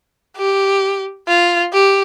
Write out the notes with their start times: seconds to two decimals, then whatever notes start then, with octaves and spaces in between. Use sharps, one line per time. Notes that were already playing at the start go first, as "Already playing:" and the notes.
0.37 G4
1.28 F4
1.73 G4